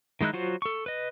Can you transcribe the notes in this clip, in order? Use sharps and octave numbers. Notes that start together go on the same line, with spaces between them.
D#3 G#3 D#4 E4 F#6
F#3 F4 F#4 C5
A4 C#6
B4 D#5